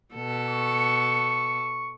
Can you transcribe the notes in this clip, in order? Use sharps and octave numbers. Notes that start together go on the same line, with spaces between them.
B2 A4
C#6